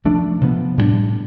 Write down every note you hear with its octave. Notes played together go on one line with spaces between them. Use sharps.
C3 F3 A3 D4
C3 F3 B3
A2 G3 B3 D4